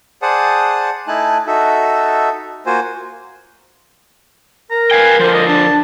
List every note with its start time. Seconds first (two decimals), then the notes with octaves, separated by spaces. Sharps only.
0.22 G#4 C5 D5 F#5 A5 D#6
1.07 A3 D#4 E4 G#5 A5 F#6
1.47 D#4 F#4 A4 E5
2.66 A#3 F4 F#4 C5 G#5
4.71 A#4 A#5
4.91 B4 F5 G5 G#5
5.19 D3 F3 C5
5.34 D#5
5.47 D4 A5